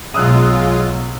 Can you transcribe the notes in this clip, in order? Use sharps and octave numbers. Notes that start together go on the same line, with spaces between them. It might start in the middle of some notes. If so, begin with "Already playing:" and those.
B1 B2 F#3 G#3 F4 D#6 E6 F#6